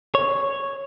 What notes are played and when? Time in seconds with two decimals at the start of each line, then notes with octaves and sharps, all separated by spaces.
0.15 C#5